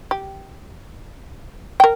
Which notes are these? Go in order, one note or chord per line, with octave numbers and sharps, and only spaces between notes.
G4
A#4 G5